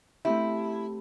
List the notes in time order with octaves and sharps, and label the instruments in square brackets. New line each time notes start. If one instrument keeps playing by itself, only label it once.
[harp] A3 C4 G4 [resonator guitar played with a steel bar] E4